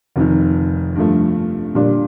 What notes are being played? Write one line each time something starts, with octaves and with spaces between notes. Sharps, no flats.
F1 F2 D#3
G2 F3 A3
A#2 G3 D4